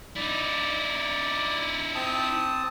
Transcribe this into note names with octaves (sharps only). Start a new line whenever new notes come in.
D#4 E4 D5
C4 A5 D#6